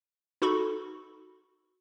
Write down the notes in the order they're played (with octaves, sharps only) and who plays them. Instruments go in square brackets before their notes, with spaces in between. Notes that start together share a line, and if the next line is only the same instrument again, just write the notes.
[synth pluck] D#4 F#4 A4 B5 C#6